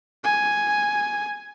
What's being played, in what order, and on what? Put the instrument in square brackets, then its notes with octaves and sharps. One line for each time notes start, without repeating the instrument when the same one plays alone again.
[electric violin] G#5